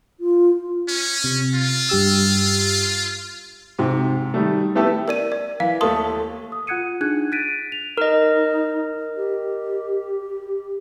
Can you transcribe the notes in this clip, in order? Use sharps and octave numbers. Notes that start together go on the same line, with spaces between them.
F4
C#4
C3
F4
G2 G4 E6
G#2 C3
D#3 G3 A3
A3 B3 E4 G4 A4
A#4 D5 D#7
D5
E3 F5
D#2 A3 A5 C6 D#6
D#6
F4 F#5 F#6 G#6 C#7 D#7
D4 D#4 G#4 F#6 G#6
F#6 A6 B6 D7 D#7
F7
D#4 A#4 D#5
G4